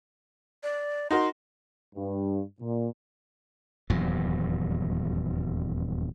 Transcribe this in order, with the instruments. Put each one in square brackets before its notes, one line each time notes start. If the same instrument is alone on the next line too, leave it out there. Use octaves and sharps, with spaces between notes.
[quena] D5
[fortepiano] D#4 F#4 A#4 [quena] C6
[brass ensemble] G2
A#2
[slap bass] D#1 E2 G2 F#3